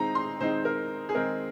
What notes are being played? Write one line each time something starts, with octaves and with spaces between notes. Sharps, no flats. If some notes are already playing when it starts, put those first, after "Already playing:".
Already playing: D#3 G#3 C4 D#4 A#5
C6
D#3 G#3 C4 D#4 C5
A#4
G#4
D#3 G#3 C4 D#4 A#4